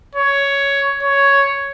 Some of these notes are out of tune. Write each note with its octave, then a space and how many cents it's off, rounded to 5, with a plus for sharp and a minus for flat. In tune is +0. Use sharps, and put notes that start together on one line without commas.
C#5 +10
C#5 +5